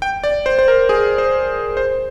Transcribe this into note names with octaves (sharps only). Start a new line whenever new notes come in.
G5
D5
C5
C5
A#4
G#4
C5
C5